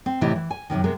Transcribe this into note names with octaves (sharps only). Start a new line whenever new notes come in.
C4
A2 C3 E3 E4 G4 D#5
E3
G#5
F#2 A2 C3 D#3
C3 G#3 B3 A#4